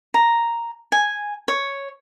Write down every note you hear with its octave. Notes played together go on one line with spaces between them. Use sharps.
A#5
G#5
C#5